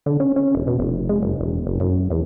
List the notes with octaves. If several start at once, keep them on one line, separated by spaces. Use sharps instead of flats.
D3
C#4
C#4
E1
B2
F1
G#3
F#1
E1
F#1
F#2
E2